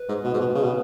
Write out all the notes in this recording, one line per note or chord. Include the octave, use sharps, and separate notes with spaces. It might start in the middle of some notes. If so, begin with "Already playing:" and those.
Already playing: B4
G#2
B2
G#2
B2
C#3
B2